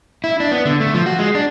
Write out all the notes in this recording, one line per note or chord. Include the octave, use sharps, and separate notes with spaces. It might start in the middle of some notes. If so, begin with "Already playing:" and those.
E4
D4
B3
D3
A3
F3
F#4
G#3
D4